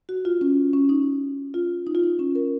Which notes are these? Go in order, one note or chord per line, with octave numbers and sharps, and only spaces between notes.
F#4
F4
C#4
C#4
D#4
F4
D#4
F4
D#4
C#4
A#4